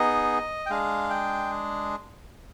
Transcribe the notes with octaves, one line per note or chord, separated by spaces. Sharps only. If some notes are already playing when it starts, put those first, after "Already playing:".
Already playing: B3 D#4 G#4 D#5
G5
G#3 D4 G#4 F5
G5